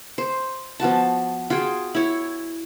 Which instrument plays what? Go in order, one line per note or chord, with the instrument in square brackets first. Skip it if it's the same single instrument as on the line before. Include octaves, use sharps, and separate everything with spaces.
[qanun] C5
F3 B3 F#4 A5
F4 F#4 G#4 G5
E4 C#5